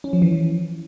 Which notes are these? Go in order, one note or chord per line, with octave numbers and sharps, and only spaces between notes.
C#4
F3
E3